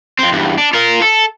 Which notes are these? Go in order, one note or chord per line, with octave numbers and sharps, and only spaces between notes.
F2 C4
E2 G2
D4
F4 A#4
A4